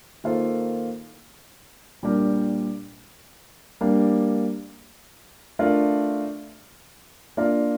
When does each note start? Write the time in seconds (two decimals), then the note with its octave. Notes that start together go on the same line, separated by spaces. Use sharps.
0.24 D#3 A#3 F4 A4 C5
2.03 A#2 G3 D4 G4 A#4
3.81 G3 A#3 D4
5.59 A3 D4 F4 A#4 D5
7.37 A#3 D4 F4 A#4 D5